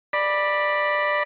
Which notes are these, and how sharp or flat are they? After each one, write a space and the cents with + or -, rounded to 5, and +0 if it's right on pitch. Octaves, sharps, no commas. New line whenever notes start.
D5 +10 B5 -10